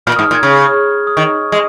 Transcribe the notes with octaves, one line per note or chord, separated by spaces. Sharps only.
A#2 F6
G#2 D#6
F6
A#2
G#6
C#3 F6
D#6
D#3 C#6
G#3 D#6